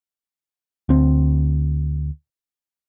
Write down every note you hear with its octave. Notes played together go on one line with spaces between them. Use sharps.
D2 C4